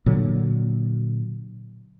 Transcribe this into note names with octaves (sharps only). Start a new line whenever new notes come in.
A#2 D3 F#3